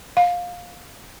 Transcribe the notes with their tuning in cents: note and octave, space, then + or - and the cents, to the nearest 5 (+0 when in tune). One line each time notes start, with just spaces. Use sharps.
F5 +20